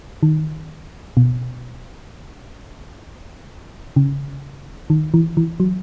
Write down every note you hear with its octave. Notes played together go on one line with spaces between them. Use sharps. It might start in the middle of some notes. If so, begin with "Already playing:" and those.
D#3
B2
C#3
D#3
E3
E3
F#3